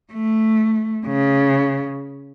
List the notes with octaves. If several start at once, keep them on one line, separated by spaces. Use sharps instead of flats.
A3
C#3